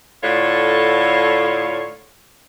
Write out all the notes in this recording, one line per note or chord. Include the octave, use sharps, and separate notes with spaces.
A2 D3 F4 A4 C#5